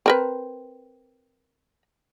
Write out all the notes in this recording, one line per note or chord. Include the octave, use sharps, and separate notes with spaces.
C4 A#4 B4